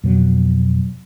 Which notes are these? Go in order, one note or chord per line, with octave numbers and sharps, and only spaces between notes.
F2 B2 F#3